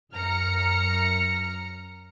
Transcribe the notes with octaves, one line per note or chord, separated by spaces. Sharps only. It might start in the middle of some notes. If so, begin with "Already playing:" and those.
F#2 A#5 F6 C#7